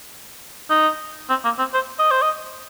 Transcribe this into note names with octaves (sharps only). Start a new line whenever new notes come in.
D#4
C4
A#3
C4
C5
D#5
C5
D#5